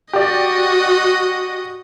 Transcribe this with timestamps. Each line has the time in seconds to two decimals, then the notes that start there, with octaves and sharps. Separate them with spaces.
0.13 F#4 G4 D5 D#5